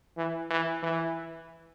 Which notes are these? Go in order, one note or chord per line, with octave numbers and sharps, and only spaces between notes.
E3
E3
E3